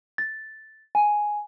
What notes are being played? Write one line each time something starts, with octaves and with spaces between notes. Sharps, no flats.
A6
G#5